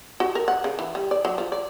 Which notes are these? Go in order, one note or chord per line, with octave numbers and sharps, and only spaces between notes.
F#4
A#4
F#5
C#3
E3
G3
D5
F#3
F3
D5